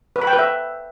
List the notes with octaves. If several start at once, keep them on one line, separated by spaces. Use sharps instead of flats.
B4
B5
G5
B4
E5